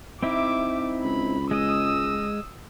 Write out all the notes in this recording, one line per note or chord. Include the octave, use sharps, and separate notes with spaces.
C4 D#4 E4 E5 D6
C#2 B5
G#3 D#5 D#6 E6